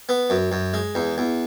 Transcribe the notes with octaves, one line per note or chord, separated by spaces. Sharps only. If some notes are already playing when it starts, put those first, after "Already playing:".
B3
F#2
F#2
G#3
E2
E2